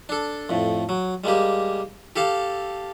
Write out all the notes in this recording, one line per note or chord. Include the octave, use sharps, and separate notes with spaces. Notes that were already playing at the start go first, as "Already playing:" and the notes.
D4 A4
F2 A2
F#3
G3 G#3 A#3 G4
G4 A4 F5 A5